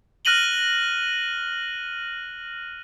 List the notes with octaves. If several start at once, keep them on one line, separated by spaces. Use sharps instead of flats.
F6 F#6 A#6 D#7 F#7 G7